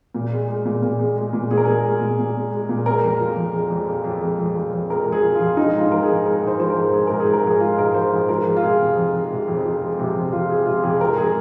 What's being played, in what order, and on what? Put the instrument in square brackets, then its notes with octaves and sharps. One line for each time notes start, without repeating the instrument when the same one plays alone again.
[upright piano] A#2
G#3
G#3
A#2
A#2
G#3
G#3
A#2
A#2 G#4
A#4
G#3 G#4
G#3
A#2
A#2
G#3
G#3
A#2
G#3 A#4
F2
F3
F2
G#3
F2
F3
F2
G#3
F2
F3
F2
G#3 A#4
F2
G#4
F3
F4
F2
G#3 D#4
G#2 F4
F3 A#4
G#4
G#2
G#3 A#4
G#2
C5
F3 C5
A#4
G#2
G#3 G#4
G#2 A#4
G#4
F3
A#4
G#2 G#4
G#3 F4
G#2 A#4
F3 C5
G#2
F3 A#4
G#3
F4
C3 G#4
F2
F3
G#3
C3
F2
F3
G#3
C3
F2
F3 F4
G#3 G#4
C3 F4
F2 G#4
G#2 A#4
G#3 G#4